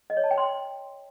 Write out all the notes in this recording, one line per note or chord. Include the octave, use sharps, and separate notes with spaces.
D#5
C#5
A5
G5
C6